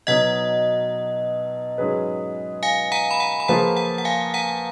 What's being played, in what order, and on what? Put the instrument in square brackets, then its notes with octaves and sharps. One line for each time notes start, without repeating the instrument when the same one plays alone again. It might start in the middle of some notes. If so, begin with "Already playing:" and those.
[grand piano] B2 F#3 B3 D#4 [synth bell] D#5 F#5
[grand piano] G#2 F#3 C#4 G#4 B4
[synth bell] F5 G#5
F#5 A#5
B5
F#5 A#5
B5
[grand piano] F3 A#3 F4 G#4 B4 [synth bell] F#5 A#5
[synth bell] F#5 A#5
F#5
F5 G#5
F#5 A#5